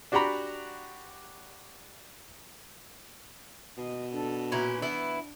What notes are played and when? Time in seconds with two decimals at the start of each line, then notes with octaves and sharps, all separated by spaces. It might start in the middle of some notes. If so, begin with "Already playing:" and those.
0.12 D4 F#4 G4 F#5 A#5 B5
3.78 B2 D#5
4.13 D4 A4
4.52 A#2 C#4 E4 F#4 B4
4.82 E3 B3 D4 E4